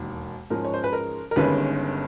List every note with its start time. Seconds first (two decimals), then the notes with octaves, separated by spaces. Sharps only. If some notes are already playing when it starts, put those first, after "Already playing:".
Already playing: E1 D#2 D#3
0.50 G#2 F3 G#3 C#4 A#4
0.65 C#5
0.74 C5
0.84 B4
0.93 A#4
1.31 A#4
1.36 G1 G2 D#3 G#3 C#4 B4